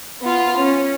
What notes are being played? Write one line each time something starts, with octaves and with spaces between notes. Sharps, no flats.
B3 F4
C#4